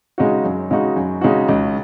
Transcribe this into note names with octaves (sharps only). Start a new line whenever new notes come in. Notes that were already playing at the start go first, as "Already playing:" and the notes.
C#3 G#3 D#4 F#4
F#2
C#3 G#3 D#4 F#4
F#2
C#3 G#3 D#4 F#4
C#2